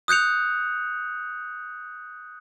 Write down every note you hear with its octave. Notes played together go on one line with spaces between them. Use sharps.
D#6 F#6 G6 C#7 F7